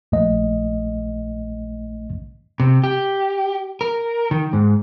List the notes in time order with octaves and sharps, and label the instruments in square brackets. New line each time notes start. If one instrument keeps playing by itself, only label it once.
[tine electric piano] A#1 A3 D#5
[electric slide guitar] C3
G4
A#4
D#3
G#2